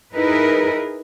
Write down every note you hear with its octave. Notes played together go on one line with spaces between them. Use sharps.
D#4 E4 G#4 A#4 B4